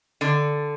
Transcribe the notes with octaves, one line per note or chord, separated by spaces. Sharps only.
D3